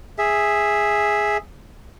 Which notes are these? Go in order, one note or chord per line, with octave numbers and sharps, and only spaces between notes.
G#4 E5